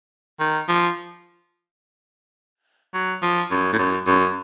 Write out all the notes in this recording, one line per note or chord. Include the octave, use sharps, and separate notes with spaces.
D#3
F3
F#3
F3
F#2
A2
F#2
F#2